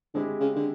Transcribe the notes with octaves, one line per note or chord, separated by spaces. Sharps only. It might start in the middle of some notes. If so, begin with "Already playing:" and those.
D3 G#3 C4 E4 G4
C#3
D3